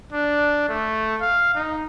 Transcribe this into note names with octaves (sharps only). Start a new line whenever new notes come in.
D4
A3
F5
D#4